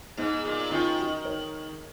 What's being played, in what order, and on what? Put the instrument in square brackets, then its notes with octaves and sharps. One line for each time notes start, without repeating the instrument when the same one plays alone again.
[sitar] G#2 [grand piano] B3 D#4
[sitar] A#2
[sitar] D#3 [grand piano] C#4 F4
[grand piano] D#4 F#4
A#4 C#5